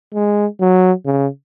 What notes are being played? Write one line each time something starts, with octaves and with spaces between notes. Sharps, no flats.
G#3
F#3
C#3